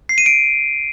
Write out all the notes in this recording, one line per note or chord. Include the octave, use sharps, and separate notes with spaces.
C7
D#7
D7